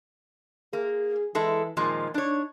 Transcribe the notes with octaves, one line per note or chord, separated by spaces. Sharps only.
A#3 G#4
E3 G#3 E4 A4
A#2 D#3 F3 G#3
D4 D#4 C#5